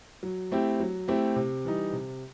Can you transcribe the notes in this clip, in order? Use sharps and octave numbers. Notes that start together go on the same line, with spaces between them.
F#3
A3 C4 E4 G4
F#3
A3 C4 E4 G4
C3
E3 G3 D#4
C3